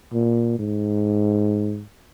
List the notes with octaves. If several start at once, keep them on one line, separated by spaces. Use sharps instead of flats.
A#2
G#2